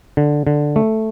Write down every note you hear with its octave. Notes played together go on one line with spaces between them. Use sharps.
D3
D3
A3